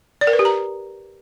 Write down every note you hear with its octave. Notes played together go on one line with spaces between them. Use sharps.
D5
A#4
B4
G4
A#5